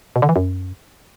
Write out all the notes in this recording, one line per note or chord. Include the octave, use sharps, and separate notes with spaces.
B2
D3
E3
F#2